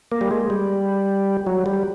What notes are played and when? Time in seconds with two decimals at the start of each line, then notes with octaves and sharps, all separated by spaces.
0.12 A#3
0.21 G3
0.31 G#3
0.50 G3
1.47 F#3
1.66 G3